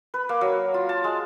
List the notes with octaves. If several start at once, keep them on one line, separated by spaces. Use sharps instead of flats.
B4
A#3
F#3
F4
A5
G#3